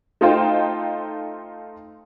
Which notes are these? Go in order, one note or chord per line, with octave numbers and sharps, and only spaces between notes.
A3 D#4 F4 C5 G5